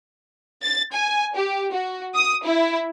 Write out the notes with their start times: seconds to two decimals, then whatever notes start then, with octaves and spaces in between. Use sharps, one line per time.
0.62 A6
0.94 G#5
1.35 G4
1.73 F#4
2.15 D#6
2.45 E4